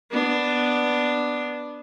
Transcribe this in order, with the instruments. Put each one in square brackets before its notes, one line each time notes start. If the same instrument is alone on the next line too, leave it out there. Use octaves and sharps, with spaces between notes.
[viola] B3 D4